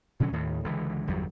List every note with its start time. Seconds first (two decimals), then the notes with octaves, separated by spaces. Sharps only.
0.20 B2 D3 F#3 C#4
0.32 D#2 A2 D#3
0.64 C#2 D3 E3 G#3
1.07 G1 E2 F#3 G3